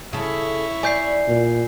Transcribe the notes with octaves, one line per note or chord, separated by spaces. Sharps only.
C#3 E4 A4 C#5
D5 G#5 G6 C7
A#2